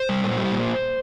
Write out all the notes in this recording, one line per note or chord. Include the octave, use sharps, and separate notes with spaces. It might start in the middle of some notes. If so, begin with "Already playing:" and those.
Already playing: C5
G3
A#2
G3
A#2